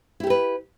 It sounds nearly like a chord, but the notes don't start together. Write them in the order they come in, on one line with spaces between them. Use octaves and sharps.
E4 G4 A4 B4